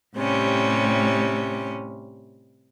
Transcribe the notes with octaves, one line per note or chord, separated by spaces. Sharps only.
A2 C3 G3 C#4